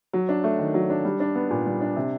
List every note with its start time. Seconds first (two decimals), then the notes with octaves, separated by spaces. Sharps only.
0.13 F#3
0.29 D4
0.44 A3
0.59 D#3
0.74 F#3
0.90 D4
1.05 G3
1.20 D4
1.35 B3
1.50 A#2
1.66 G3
1.81 D4
1.96 C3